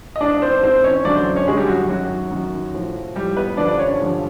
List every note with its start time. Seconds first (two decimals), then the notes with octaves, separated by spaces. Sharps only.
0.16 D#5
0.21 G#2 E3 D4 D5
0.42 C4 C5
0.63 G#2 E3 C4 C5
0.84 C#4 C#5
1.05 F#2 D3 F#3 D4 D5
1.15 C4 C5
1.36 C#4 C#5
1.48 F#2 D3 F#3 G#3 G#4
1.57 G3 G4
1.69 F#4
1.89 F#2 D#3 F#3 F#4
2.31 F#2 D#3 F#3
2.74 A2 F3
3.16 A2 F3 G3 G4
3.37 B3 B4
3.57 G2 D3 F3 D4 D5
3.68 D5
3.79 C#4 C#5
4.00 G2 D3 F3